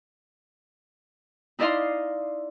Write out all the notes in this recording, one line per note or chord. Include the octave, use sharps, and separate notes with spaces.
D#4 E4 D5 D#5 F5 C6